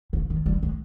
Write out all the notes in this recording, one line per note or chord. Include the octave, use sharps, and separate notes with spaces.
C#3
D#3
G3
G#3